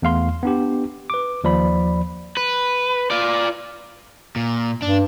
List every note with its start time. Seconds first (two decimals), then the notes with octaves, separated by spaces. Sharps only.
0.02 E2 A3 F5 C6
0.43 B3 D4 G4
1.10 B4 D6
1.44 D#2 F3 D5 B5
2.37 B4
3.11 F4 D5
4.36 A#2
4.82 G2 D4